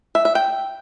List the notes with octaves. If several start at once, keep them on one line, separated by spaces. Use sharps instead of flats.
E5
E5
G5